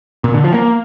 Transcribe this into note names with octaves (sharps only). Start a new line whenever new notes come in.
A#2
D3
F3
A#3